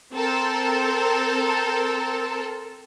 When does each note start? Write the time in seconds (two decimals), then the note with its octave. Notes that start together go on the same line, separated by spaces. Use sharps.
0.14 C4 A4 A#4